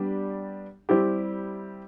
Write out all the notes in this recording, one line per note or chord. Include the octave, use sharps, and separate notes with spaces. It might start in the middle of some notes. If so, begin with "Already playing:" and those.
Already playing: G3 B3 D4 G4
G3 C4 E4 G4